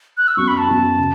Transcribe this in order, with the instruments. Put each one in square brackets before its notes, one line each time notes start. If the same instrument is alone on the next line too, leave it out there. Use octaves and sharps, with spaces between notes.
[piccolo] F#6
E6
[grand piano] F#2 F#3 B3 F#4 [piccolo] C#6
[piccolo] B5
A5
[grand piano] F#2 F#3 B3 F#4
C#3